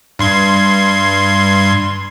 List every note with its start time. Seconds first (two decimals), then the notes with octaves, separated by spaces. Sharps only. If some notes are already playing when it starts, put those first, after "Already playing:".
0.19 G2 C6 G#6